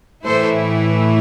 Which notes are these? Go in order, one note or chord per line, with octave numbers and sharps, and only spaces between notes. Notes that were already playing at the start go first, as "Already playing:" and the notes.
A2 E3 A3 E4 A4 C5